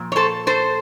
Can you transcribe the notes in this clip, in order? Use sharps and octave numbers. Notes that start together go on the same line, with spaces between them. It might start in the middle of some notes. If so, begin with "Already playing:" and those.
Already playing: A#2 F3
C#5
A4 C5
A4 C5